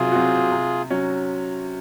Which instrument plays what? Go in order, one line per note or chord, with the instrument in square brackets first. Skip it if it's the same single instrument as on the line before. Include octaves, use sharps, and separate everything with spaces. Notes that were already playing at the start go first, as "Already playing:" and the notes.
Already playing: [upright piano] C3 F#3 C4 F#4 [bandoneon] F4 G#4
[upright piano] F#3 C4 F#4
C3
F#3 C#4